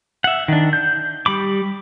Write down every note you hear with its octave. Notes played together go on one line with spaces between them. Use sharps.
E5 F#5
D#3 D4
G6
G3 B5 D6